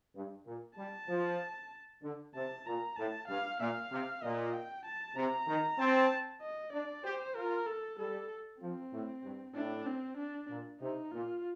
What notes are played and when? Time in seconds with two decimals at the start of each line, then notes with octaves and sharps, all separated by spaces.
0.15 G2
0.46 A#2
0.77 G3 A5
1.09 F3
2.02 D3
2.35 C3 A5
2.66 A#2 A#5
2.96 A2 A5
3.28 G2 F5
3.59 A#2 F5
3.91 C3
4.22 A#2 D#5
4.54 G5
4.85 A5
5.16 C3 A#5
5.47 D#3
5.78 C4 A5
6.42 D#5
6.73 D4 D5
7.04 G4 C5
7.36 F4 A#4
7.66 A4
7.98 G3 A4
8.61 F3 C4
8.92 A2
9.23 G2
9.55 A2 D4
9.86 C4
10.17 D4
10.50 A#2
10.80 C3 D#4
11.12 A#2 F4